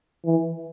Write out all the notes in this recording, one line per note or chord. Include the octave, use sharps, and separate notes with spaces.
E3